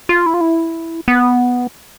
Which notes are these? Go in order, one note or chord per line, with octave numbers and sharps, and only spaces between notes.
F4
E4
F4
E4
B3